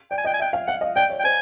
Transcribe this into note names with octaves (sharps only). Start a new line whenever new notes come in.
D5 G5
G#5
D#5 G5
G#5
E5 G5
F5
F5 F#5
D#5
D5 G5
C#5
G5
C5 G#5